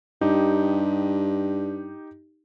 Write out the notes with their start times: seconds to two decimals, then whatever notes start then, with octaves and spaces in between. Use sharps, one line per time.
0.21 G2 D#4 G4